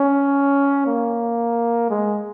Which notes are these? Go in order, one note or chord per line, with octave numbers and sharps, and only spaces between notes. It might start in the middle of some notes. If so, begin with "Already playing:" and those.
Already playing: C#4
A#3
G#3